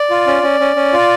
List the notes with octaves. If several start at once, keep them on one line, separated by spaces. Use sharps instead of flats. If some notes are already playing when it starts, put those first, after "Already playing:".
Already playing: D5
F4
C#4
C#4
C#4
C#4
F4